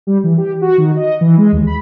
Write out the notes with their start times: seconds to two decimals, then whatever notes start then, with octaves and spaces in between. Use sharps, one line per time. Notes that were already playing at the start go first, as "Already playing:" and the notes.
0.07 G3
0.24 E3
0.37 G4
0.62 F#4
0.78 D#3
0.96 D#5
1.21 E3
1.38 G#3
1.53 D#2
1.67 B5